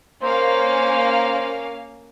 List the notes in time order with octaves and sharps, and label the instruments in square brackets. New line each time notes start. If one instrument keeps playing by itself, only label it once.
[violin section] A#3 C#4 F5 [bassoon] C5